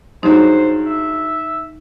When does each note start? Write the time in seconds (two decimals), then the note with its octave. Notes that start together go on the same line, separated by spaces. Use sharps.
0.23 G2 F#3 G#3 D#4 C5
0.86 E5